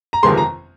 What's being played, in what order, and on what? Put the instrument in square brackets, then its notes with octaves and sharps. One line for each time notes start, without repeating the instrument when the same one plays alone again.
[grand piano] A#5
[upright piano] G1 F2 C3 D#3 G#3 [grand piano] C6
[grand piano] A#5